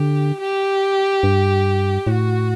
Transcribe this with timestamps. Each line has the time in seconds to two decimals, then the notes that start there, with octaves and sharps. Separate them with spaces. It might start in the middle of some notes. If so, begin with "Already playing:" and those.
Already playing: D3 G4
0.41 G4
1.23 G2
2.07 A2 F#4